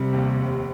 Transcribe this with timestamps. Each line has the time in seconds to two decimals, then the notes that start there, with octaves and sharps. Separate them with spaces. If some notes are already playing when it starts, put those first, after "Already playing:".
Already playing: C3 G3
0.13 D#2
0.41 F1